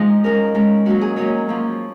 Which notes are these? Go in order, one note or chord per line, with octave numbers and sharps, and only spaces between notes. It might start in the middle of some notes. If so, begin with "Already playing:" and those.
Already playing: F3 G#3 D#4 D#5
D#3 G#3 C#4 A#4
D#3 G#3 C#4
D#3 F#3 A#3 C#4 F#4
G#4
D#3 F#3 A#3 C#4 C#5
F3 A#3 C#4